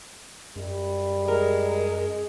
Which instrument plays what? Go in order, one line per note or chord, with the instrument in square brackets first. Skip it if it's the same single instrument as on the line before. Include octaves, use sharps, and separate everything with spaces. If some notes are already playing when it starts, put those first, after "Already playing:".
[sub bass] F#2 [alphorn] G3
[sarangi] G#3 [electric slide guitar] A#4